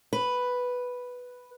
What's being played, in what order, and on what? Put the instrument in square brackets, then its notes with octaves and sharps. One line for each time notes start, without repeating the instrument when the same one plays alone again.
[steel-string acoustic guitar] B4